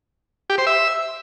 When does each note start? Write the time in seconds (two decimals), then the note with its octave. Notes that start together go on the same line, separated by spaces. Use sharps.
0.50 G4
0.58 C5
0.67 E5